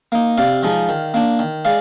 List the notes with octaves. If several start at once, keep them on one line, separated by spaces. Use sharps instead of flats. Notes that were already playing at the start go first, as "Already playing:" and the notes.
A#3 D#4
C3 D5 F5
F3 G#3 D#4
D#3
A#3 D4
D#3
G#3 D5 F5